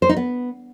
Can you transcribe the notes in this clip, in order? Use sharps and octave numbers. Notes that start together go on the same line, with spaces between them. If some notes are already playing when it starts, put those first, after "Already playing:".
C5
D#4
B3